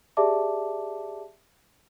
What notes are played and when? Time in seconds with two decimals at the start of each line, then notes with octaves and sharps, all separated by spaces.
0.17 G4 G#4 D5 E5 A5 D6